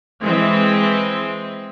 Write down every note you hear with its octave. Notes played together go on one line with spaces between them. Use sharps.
E3 G#3 C4